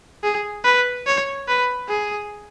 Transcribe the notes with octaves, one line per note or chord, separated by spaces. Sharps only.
G#4
B4
C#5
B4
G#4